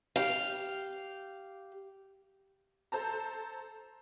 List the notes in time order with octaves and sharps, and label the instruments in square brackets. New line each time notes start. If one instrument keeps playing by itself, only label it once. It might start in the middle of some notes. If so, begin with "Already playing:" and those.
[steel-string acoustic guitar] G4 F5
[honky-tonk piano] A4 C5 A5 A#5